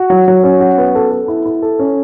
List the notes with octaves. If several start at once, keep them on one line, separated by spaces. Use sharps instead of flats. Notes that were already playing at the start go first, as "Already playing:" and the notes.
Already playing: F#4
F#3
F#3
C#4
F#4
B3
A4
A4
E4
E4
A4
C#4